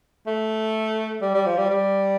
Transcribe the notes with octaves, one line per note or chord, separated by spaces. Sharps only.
A3
G3
G3
F3
G3
G3